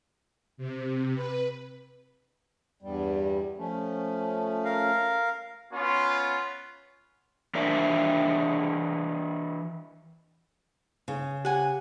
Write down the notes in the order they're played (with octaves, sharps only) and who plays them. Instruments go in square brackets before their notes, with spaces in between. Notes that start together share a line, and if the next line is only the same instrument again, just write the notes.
[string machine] C3
B4
[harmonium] E2 G2 G3
F3 A3 C#4
[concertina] A#4 F5
[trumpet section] B3 C#4 F4
[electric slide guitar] E3 D4 A#4 C5 D5 E5
[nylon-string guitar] C#3
[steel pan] G4 [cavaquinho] F#5 G#5